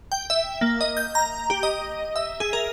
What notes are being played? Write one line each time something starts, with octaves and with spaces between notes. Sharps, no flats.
G5
E5
A#3
D#5
G6
A#5
G4
D#5
E5
G#4
A#4